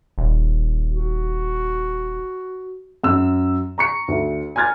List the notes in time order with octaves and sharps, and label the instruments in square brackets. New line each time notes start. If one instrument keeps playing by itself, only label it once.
[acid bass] D#1
[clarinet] F#4
[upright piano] F#2 E6
A#5 C#6 C#7
D2
G#5 A#5 F6 G#6 A6